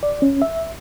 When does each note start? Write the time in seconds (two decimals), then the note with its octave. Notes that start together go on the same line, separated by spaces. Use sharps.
0.03 D5
0.22 C#4
0.42 E5